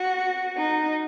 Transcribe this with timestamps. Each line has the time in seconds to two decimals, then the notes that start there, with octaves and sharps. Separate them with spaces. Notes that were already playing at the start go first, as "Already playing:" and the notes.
Already playing: F#4
0.58 D#4